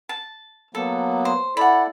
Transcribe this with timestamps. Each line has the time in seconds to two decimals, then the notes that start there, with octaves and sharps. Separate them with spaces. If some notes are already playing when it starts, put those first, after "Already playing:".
0.09 A5
0.75 F#3 A#3 B3 A4
1.25 C5
1.57 E4 A4 D5 F#5 B5